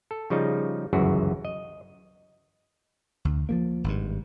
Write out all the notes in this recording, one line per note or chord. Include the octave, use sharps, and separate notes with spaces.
A4
C#3 F3 G3 D#4
G1 C#2 F#2 E3 F#4 G#4
D#5
D2
F3 G3 A#3
G#1 G2